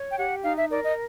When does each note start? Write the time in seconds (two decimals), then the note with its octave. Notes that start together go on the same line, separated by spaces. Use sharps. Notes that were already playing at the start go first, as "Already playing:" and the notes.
Already playing: C#5
0.10 G5
0.17 G4 F#5
0.43 D#4 F5
0.57 E5
0.69 A#4 D5
0.83 D#5